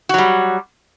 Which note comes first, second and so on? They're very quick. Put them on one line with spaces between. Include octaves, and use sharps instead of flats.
F#4 F#3 G3